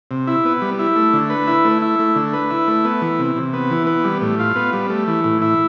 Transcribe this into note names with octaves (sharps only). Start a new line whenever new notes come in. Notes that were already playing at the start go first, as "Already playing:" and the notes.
C3
E4
B3
G3
E4
A3
D3
B4
E4
A3
E4
A3
D3
B4
E4
A3
B3
E3
C3
C3
B3
E3
B3
G3
A2
F4
B3
G3
A3
E3
A2
E4